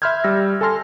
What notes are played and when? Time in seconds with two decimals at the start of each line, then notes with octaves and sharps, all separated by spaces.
0.02 E5 B5 C6 F6 G6 G#6
0.24 G3 E6 A#6
0.61 A4 G#5 A5 C6 F6 A#6